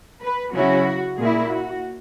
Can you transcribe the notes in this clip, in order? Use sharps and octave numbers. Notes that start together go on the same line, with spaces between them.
B4
C#3 F#3 C#4 E4 F#4
A#2 A#3 E4 G#4
F#4